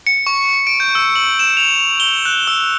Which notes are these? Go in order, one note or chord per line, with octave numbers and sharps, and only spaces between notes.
C#7
C#6
D7
G6
E6
F#7
E7
F7
F7
G7
F#6
E6